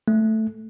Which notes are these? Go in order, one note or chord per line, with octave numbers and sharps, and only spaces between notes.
A3